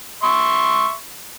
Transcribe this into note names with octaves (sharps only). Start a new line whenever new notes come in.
E5 C6 C#6